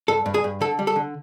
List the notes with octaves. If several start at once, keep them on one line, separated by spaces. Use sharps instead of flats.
G2 A4
G2
G#4
G2
D3 A4
G3
A4
D3